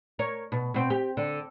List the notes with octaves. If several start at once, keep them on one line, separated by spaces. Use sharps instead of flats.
A#4 C#5
B2
B2 C4
G4
D3